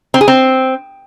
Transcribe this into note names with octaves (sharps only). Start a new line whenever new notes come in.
C4
G#4
C4